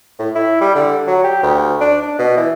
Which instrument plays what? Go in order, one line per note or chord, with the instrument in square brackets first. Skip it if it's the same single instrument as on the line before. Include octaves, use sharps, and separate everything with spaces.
[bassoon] A2
E4
G3
D3
F#3
G4
D2
D4
D4
B2
E3